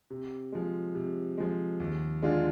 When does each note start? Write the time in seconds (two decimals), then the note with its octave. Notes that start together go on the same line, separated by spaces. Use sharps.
0.10 C3
0.52 F3 G#3
0.95 C3
1.38 F3 G#3
1.80 D#2
2.22 D3 G#3 D4 F4